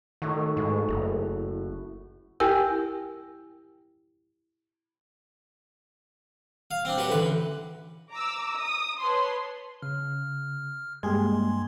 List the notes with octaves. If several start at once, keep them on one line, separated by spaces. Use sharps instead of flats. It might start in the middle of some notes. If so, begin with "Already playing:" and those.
A2 D#3 F#4
G#2
F#1
E4 G4 A#4 G5 G#5 E6
F5
C4 D4
F#3 G4 B4
A1 D2 B4
A#5 D6 E6
D#6
B4 C#5 A5 C6
C#3 F6
G2 G3 G#3 A#3 G4 G#4 C6 G#6